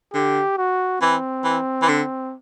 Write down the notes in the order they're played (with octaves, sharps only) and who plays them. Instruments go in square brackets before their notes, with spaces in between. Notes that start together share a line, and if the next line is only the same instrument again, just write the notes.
[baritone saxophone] D3 [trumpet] G4
[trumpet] F#4
[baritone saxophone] E3 [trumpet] C4
[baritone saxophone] E3
E3
D3